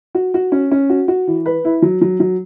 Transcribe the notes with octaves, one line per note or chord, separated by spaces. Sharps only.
F#4
F#4
C#4
C#4
F#4
F#4
E3
B4
E4
F#3
F#3
F#3